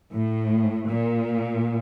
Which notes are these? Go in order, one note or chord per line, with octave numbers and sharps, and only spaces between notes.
A2
A#2